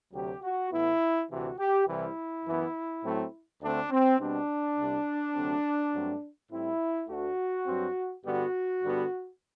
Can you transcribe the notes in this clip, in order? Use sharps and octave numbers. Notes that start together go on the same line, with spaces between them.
D2 C3 F#3 G4
F#4
A2 E3 B3 E4
D2 C3 E3 F#4
G4
C2 C3 E3 G3 C4 E4
F#2 E3 B3
A2 F#3 A3 C4
D2 D3 A3 C4 D4
C4
B2 G3 C4 D4
C2 C3 G3
D2 C3 F#3 A3 C4
G2 F#3 A3 C4
A2 G3 C4 E4
D2 D3 A3 F#4
G2 F#3 C4
G2 D3 G3 B3 F#4
G2 D3 G3 B3